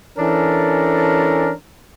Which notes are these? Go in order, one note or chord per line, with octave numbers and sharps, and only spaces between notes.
E3 C#4 D4 A4 A#4